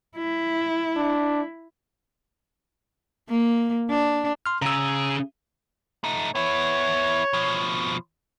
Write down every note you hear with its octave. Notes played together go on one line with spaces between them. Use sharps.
E4
D4
A#3
D4
C6 F6
C#3 G#4 A#5 E6
A3 D#4
B3 E4 C#5
B2 F3